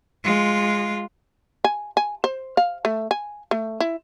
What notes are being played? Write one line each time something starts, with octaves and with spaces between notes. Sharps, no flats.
G#3 F4
G#5
G#5
C5
F5
A3
G#5
A3
E4